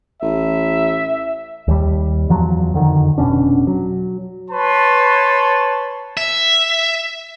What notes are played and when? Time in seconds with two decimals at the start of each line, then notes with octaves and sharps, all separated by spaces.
0.22 A1 E5
1.68 D#2 G3
2.29 E2 F3 F#3
2.74 F2 D3 D#3
3.18 F1 B2 C#4 D4
3.67 F#3
4.50 B4 C#5 A5 C6
6.17 E5